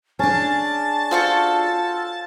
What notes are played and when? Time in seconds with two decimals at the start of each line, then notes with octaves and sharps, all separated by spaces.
0.19 C#4 D4 G#4 A5
1.11 F4 F#4 A4 C5 C#6